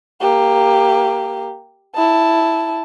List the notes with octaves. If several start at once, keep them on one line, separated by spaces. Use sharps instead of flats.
A#3 G4
E4 A5